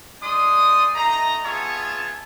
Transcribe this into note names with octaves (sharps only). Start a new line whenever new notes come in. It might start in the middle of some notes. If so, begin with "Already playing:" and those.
G#3 D#4 D5 C6 D#6
A3 D#4 D#5 A#5
B3 F4 G#4 C#5 E5 A5